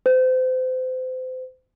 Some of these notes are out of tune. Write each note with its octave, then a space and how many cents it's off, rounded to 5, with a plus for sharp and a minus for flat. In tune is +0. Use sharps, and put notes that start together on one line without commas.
C5 -30